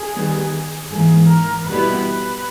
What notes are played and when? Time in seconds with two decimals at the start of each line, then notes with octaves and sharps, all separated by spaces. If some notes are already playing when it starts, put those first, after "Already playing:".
Already playing: G#4
0.14 D#3 G3 B3
0.89 G#2 E3 A#3 G#4
1.28 A#4
1.66 B2 G3 B3 E4 B4
2.04 B4